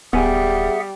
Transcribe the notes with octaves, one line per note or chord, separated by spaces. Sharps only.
D1 G3 B3 G#4 E5 F#5 G#5